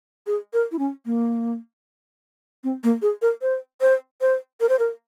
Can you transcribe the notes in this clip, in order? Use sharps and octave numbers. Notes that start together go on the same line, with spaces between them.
G#4
A#4
E4
C#4
A#3
C4
A#3
G#4
A#4
C5
C5
C5
A#4
C5
A#4